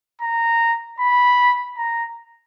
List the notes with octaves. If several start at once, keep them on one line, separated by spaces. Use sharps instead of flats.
A#5
B5
A#5